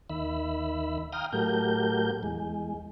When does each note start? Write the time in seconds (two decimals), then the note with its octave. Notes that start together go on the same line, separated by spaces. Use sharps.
0.10 D#2 D#3 E5 B5
1.12 F5 G5 A#5 D#6 F6
1.33 A2 F#3 A3 G4 A#4 G6
2.23 E2 G#3